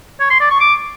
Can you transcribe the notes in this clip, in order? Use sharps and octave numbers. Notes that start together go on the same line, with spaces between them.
C#5
C6
D5
C#6
D6